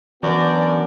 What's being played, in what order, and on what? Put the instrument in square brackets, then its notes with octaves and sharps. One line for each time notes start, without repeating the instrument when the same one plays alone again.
[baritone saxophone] F#2 [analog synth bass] E3 [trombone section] B3 D4 F#4 [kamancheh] D5